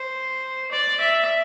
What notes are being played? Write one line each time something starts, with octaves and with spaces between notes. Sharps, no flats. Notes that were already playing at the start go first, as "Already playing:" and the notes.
Already playing: C5
D5
E5